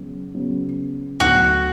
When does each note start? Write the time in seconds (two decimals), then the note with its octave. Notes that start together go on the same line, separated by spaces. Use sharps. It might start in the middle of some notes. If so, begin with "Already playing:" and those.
Already playing: C#3 F#3 B3
0.35 C#3 F#3 B3
1.20 D2 D3 F#3 B3 F#4